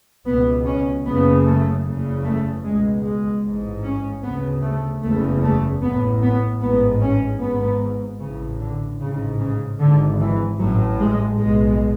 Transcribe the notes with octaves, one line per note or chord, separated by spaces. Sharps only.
C#2 B2 B3
C#4
F#1 F#2 C#3 B3
A3
F#1 E2 C#3
A3
C#2 B2 G#3
G#3
A1 G#2
C#4
D2 C#3 B3
A3
F#1 E2 C#3 A3
A3
A1 A2 B3
B3
A1 G#2 B3
C#4
G#1 G#2 B3
A1 A2 C#3
D3
A1 G#2 C#3
C#3
G#1 G#2 D3
E3
A1 A2 F#3
G#3
B1 B2 G#3